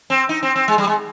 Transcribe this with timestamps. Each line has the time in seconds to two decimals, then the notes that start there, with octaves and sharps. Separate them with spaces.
0.10 C4
0.29 D#4
0.43 C4
0.56 C4
0.68 G#3
0.78 G3
0.87 G#3